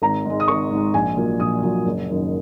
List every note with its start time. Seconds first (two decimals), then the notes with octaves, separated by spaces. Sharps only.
0.02 G#1 A#5
0.25 G#2 G#3
0.40 D#6
0.48 G#1 C#6
0.70 G#2 G#3
0.94 A#1 G#5
1.16 A#2 F#3
1.40 A#1 D#6
1.62 A#2 F#3
1.86 F#1
2.08 F#2 D#3